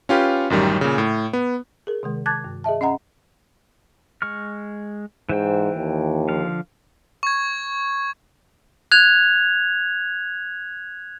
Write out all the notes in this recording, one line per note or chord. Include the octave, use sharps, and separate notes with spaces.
C#4 F4 G4 B4
A1 F#2 D#3 G3
A#2 C#3
A2
B3
G#4 A#4
C3 D#3 G#3
A5 D6 F#6 G#6 A6
G2
G#4 D#5 E5 A5
C#4 D#5 F#5 A#5
G#3 C#6 F6
G#2 E3 C5 G5
D#2
D3 F3 F5
C#6 G#6
F#6 G#6 F7